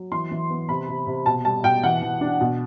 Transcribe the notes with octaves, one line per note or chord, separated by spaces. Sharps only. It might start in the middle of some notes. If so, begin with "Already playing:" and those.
Already playing: F#3
E3 C6
E3
B3
C3 B5
C3
C3
B2 A5
G3 A5
B2 G5
E3 F#5
E3
D4
B2